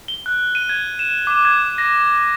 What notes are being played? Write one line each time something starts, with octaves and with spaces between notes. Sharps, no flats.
G7
F#6
D#7
G#6
E7
D6
G#6
A#6